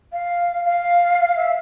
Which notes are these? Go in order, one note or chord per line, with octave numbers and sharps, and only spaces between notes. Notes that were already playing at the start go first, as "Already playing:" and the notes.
F5
F5
E5